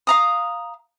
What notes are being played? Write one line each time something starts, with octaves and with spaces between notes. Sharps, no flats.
F5 A#5 D#6